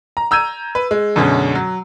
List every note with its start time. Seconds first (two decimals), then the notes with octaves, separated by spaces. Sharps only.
0.17 A#5
0.31 A#5 E6 G6 G#6 D#7
0.75 B4
0.91 G#3
1.16 F#2 B2 D3 G#3 C#4
1.55 F#3